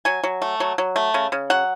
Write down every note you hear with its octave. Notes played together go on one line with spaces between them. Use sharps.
F#3 G#5
F#3
A3
F#3
F#3
A3
C#3
C#3
F#3 F#5